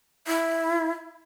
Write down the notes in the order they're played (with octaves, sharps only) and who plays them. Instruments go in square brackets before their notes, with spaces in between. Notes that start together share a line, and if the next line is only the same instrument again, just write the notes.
[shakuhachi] E4